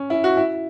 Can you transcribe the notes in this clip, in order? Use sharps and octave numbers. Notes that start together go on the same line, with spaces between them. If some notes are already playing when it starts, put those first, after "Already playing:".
Already playing: C#4
E4
F#4
E4